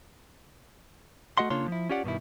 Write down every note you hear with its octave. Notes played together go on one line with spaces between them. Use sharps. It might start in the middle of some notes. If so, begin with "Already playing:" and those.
A3 F#4 D#5 F#5 C6
C#3 A#3 D4 F4 C#5 C6
F3 E4
C#4 F4 G4 D5 F#5
G2 B2 D#3 E4